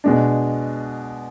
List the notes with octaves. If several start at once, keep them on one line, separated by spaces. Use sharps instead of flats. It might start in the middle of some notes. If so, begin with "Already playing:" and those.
B2 G#3 D4